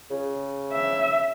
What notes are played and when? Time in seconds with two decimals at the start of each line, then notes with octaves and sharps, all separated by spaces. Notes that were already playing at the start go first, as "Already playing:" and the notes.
0.10 C#3
0.72 E5